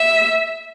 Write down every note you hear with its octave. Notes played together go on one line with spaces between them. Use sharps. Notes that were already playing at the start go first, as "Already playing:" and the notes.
Already playing: E5